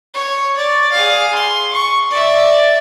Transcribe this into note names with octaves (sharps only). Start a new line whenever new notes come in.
C#5
D5
G#4 F5
C6
C#6
D5 E5